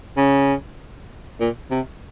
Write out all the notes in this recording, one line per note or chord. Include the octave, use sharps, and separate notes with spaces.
C#3
A#2
C3